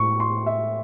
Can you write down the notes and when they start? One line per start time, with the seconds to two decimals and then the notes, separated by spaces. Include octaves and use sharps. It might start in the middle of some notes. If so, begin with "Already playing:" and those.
Already playing: A2 C#6
0.20 C6
0.46 E5